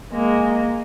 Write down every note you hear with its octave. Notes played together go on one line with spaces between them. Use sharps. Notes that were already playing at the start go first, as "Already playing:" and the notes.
G#3 A#3